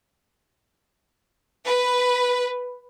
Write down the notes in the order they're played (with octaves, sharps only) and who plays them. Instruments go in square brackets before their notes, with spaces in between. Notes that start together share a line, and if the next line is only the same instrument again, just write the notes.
[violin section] B4